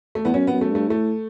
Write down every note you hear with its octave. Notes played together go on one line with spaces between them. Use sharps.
A3
E2 B3
F#2 C#4
B3
F#2
A3
G2
A3
A2 A3